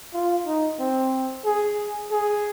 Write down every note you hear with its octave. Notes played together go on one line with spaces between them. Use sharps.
F4
D#4
C4
G#4
G#4